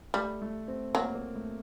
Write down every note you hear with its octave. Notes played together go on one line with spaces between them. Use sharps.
G3 A3
A3
C4
F#3 A#3
A#3
A3